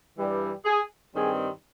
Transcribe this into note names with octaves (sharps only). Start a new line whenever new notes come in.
G2 E3 G3
G#4
G2 D#3 G3 C4 G#4